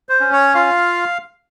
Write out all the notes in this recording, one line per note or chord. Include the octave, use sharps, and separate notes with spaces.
C5
C#4
C#5
F4 F5